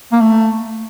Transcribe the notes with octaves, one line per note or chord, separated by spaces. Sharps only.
A#3
A3